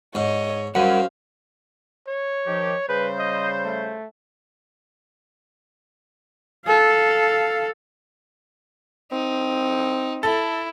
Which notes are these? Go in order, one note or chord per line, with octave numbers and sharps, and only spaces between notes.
G#2 C#5 D#5
F#2 G3 A#4 C5 F5 F#5
C#5
D#3 F3 G4
C#3 G3 B4 C5
D#5
A3
A4 F5
C4 D#4
E4 A4